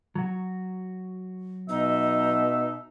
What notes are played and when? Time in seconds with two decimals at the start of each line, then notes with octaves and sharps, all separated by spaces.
0.15 F#3 F#4
1.69 B2 D#4 E5